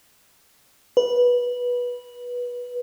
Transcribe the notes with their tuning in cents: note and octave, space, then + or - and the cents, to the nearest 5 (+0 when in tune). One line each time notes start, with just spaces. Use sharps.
B4 -15